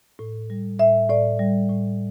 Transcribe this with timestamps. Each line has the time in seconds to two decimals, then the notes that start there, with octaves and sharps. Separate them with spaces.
0.19 A2
0.50 G3
0.79 A2 E5
1.09 A2 D5
1.39 G3
1.69 A2